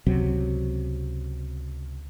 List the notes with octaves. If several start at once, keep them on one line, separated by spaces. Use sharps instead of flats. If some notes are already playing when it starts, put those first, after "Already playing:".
C#2 C3 F#3 C4